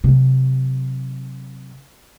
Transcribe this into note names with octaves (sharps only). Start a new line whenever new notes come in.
C3 F#3